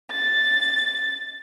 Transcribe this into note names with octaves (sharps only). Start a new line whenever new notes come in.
A6